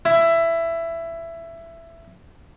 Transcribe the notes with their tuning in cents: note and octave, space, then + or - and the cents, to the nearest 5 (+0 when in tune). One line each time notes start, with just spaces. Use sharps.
E4 +15